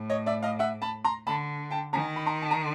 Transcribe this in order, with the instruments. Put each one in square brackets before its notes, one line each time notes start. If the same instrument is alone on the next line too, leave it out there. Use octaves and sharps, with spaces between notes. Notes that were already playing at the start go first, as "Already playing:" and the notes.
Already playing: [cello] A2
[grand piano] C#5 D#5
D5 E5
D#5 F5
E5 F#5
A5 B5
A#5 C6
[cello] D3 [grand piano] A5 B5
[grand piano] G5 A5
[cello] D#3 [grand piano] G#5 A#5
[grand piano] B5
A#5 C6
A5
A#5